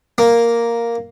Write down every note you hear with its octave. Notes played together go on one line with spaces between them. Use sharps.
A#3